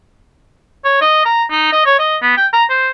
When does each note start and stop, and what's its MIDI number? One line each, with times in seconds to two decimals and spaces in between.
0.85 0.97 73
1.01 1.21 75
1.25 1.43 82
1.51 1.70 63
1.73 1.85 75
1.86 1.94 73
1.99 2.16 75
2.22 2.34 59
2.37 2.47 79
2.53 2.64 82
2.70 2.91 72